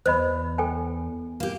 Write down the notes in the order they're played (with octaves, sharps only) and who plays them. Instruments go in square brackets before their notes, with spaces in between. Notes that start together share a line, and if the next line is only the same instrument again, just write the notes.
[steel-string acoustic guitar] E2 [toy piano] C5 D#5 B5
[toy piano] A4 G5 G#5
[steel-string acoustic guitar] A#3 G4